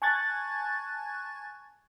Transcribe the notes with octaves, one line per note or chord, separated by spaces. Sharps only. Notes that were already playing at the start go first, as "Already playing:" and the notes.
G#5 A5 C#6 F#6 G#6 A6